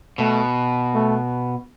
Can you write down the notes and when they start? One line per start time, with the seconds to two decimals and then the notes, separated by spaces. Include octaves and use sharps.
0.18 B2 A3
0.94 A3